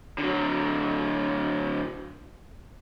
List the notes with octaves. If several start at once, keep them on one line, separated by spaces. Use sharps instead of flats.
D3 F#3